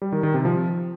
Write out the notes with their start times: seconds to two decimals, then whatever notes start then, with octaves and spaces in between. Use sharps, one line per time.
0.02 G3
0.12 D#3
0.23 D#3
0.34 C3
0.45 F3